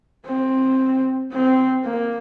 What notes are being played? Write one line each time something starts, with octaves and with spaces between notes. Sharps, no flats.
C4
C4
A#3